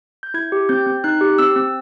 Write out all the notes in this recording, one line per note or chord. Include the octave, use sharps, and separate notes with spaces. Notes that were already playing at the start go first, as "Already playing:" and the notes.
G6
E4 G#6
G4
C4 G6
C4
D#4 F#6
G4
C4 E6
C4